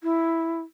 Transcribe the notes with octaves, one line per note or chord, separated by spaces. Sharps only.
E4